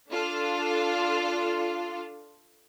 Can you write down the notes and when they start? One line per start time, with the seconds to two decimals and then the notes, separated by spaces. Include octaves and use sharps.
0.10 D4 F4 A4